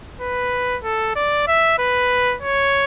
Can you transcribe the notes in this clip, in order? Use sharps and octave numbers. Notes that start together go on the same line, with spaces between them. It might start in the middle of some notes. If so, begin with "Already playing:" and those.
B4
A4
D5
E5
B4
C#5